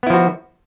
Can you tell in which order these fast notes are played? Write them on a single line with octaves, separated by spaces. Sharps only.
B3 E4 F3 F#4